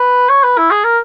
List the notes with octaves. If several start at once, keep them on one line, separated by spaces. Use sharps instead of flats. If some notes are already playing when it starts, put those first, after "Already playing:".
Already playing: B4
C#5
B4
E4
G#4
A#4